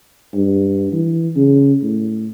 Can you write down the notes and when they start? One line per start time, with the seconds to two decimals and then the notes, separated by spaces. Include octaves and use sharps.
0.34 G2
0.93 E3
1.36 C#3
1.83 A2